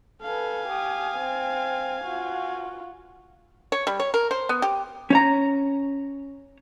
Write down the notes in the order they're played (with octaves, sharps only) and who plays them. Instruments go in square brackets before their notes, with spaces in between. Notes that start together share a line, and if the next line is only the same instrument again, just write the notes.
[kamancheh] A4 B4 [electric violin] F5 G#5
[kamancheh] G4 D#6
C4
F4 F#4
[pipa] C#5
G3
C#5
A#4
C5
B3
G4
[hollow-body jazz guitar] C#4 C#5 A#5